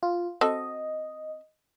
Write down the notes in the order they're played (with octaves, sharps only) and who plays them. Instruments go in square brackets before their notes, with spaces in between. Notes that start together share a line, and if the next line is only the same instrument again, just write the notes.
[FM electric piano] F4
[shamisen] C4 F#4 A4 [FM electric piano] D#5